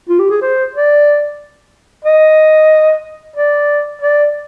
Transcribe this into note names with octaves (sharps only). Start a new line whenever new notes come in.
F4
G4
G#4
C5
D5
D#5
D5
D5